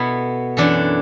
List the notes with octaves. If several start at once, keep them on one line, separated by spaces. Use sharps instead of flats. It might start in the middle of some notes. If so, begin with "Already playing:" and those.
Already playing: B2 B3 E4 A4
F#2 E3 D4 A4